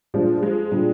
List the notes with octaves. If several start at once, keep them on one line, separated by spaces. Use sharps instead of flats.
A#2 F3 G3 G#3 D4
F3 G#3
A#2 G3 D4